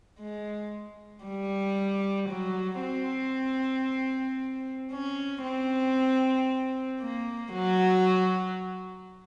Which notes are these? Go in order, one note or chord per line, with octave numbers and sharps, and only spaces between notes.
G#3
G3
F#3
C4
C#4
C4
A#3
F#3